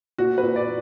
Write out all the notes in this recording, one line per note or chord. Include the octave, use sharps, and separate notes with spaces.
A#2 F#4
B4
A#2
D5